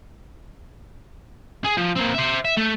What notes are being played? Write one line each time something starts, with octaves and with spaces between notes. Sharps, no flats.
G#4
F3
A#3 C4
C5 E5
E5
A3